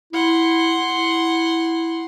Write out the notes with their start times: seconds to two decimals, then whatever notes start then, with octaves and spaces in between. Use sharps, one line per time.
0.13 E4 F#5 C6
0.96 E4